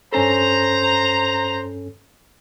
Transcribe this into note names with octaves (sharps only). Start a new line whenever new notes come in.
G2 C#4 A4 C5 A#5